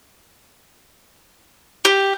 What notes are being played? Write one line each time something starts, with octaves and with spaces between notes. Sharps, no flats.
G4